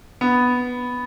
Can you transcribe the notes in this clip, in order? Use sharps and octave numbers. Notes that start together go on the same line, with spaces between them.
B3